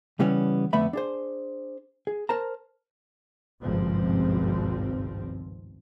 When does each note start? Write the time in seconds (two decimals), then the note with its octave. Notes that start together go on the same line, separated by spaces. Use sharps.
0.19 C#3 E3 G3 B3 C#4
0.73 F2 D3 A3 B3 E5 B5
0.93 D4 G#4 C5
2.07 G#4
2.29 A#4 C5 A5 A#5
3.62 G#1 C#2 G2 B2 F3 C4